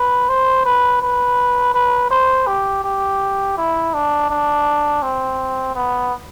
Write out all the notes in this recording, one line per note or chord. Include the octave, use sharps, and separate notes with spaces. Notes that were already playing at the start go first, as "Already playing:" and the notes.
Already playing: B4
C5
B4
B4
B4
C5
G4
G4
E4
D4
D4
C4
B3